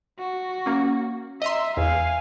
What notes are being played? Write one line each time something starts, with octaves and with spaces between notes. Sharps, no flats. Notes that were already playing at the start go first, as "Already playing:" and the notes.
F#4
A#3 C#4
D#5 E5 A#5 C6
E2 F5 G#5